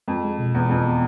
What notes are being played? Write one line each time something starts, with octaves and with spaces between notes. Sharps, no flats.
F2 G#3
G#3
B2
E2 B3
F2 G#3
B3